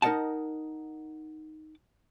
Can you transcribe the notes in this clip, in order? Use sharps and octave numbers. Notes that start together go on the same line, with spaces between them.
D#4 A#4 B4 D#5 F#5 A5